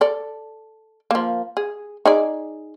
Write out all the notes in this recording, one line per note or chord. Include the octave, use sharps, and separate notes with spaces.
A4 D5
F3 A#3
G#4
D#4 G#4 D5